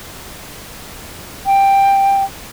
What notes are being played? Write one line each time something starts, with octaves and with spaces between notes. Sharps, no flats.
G5